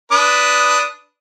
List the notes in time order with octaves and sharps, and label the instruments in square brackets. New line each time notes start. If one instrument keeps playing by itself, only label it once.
[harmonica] D4 B4 D#6